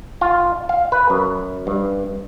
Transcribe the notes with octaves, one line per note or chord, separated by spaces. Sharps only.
F4
F5
B4
F#2
G2